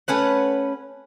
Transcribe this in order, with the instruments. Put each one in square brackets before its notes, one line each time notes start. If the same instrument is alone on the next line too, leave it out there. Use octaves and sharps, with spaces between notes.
[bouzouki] A3 C#4 B4 F#5